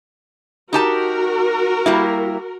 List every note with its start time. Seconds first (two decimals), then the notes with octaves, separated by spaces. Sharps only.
0.73 D#4 F#4 G4 A#4 A5
1.86 G3 A#3 E4